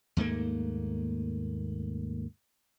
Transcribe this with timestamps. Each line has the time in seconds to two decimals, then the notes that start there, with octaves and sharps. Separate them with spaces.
0.17 D#2 G#2 A3 A#3